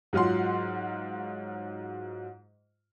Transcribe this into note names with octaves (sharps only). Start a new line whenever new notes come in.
G#2 F#3 F4 F#5 C6